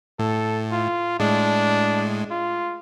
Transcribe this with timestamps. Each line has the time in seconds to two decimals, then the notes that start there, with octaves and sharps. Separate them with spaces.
0.19 A2 A4
0.72 F4
1.20 A2 G#3 D4
2.31 F4